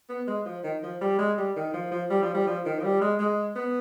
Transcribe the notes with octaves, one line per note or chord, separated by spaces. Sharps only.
B3
G#3
F3
D#3
F3
G3
G#3
G3
D#3
F3
F3
G3
F3
G3
F3
D#3
F3
G3
G#3
G#3
B3